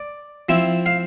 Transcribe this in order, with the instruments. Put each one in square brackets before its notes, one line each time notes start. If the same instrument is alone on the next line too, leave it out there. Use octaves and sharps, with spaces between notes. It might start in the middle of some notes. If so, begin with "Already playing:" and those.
Already playing: [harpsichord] D5
F3 C4 E4
F5